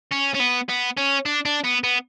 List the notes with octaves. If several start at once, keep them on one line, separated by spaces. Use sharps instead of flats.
C#4
C#4
B3
B3
C#4
D4
D4
B3
B3